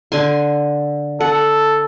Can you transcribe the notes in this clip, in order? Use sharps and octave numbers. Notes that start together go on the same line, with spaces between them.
D3 G#5 C6
A4 F#5